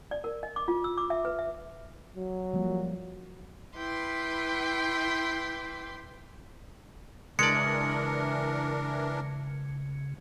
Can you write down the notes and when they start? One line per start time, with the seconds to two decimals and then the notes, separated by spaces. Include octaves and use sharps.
0.11 D5
0.24 A#4
0.43 D#5
0.56 D6
0.68 F4
0.84 E6
0.98 D6
1.10 E5
1.25 B4
1.39 E5
2.16 F#3
2.54 F3 G3 A#3
3.76 E4 B4 G5 C6 D6
7.39 C#3 E3 G#3 D4 A#4 D5 C#7